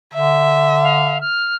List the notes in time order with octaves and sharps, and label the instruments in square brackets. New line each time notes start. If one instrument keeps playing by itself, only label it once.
[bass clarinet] D3 [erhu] E5
[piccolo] F5
F6